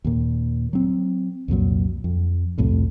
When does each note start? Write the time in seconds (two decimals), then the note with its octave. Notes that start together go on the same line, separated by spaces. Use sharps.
0.04 D#2 A#2
0.73 F#3 C4
1.48 C2 F2 A#2 F#3
2.04 F2
2.58 C2 F2 A2 C3